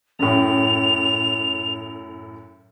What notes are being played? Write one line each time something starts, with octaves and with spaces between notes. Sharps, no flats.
F#2 A2 F7